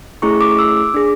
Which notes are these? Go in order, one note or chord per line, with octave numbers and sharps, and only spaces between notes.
A3 C#4 E4 G#4 C#6
D6
E6
D6
D4 G#4